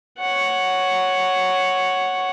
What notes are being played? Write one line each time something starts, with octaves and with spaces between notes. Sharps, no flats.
C#5 F#5